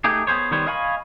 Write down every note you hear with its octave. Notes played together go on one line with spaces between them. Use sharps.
A3 D#4 G4 G#4
B3 G#4 C5 C#5
D#3 G3 B3 C5 C#5
D#5 F5 G#5 B5 C#6